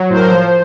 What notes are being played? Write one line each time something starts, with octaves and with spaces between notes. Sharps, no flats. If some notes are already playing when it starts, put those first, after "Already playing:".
Already playing: F#3
A2 C5
A#4
C5
F3